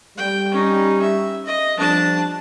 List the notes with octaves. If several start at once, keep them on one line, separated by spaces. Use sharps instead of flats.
G3 G5
C#4 D#4
E5
D#5
F3 G3 D4 A5